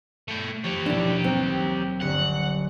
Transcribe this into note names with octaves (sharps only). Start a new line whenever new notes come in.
A3 G5
F3 G4 C#5
D#2 B2 D4 E4
F#3 A#3 C4 D#4
G1 F#3 F#5